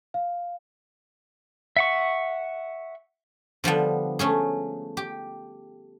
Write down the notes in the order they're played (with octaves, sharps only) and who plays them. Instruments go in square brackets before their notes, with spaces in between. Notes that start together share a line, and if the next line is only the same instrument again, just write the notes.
[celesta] F5
[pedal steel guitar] E5 F#5 C#6
[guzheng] D3 F3 G3 B3
A3 C#4 G#4
G4